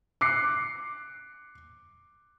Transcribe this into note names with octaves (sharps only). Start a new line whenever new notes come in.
D6 F#6 C7 C#7